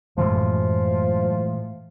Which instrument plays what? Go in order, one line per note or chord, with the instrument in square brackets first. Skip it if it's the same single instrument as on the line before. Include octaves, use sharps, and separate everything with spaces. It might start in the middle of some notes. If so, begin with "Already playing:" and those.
[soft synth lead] F#2 [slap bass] A2 E3 G#3 [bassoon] F3